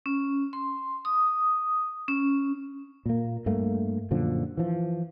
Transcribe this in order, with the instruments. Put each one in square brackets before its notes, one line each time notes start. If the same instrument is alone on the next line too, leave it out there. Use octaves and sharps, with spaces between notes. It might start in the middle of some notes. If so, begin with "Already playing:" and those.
[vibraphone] C#4
C6
D#6
C#4
[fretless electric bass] A#2 A#3
G2 A3 A#3
F#2 A#2 D3 F3
E3 F3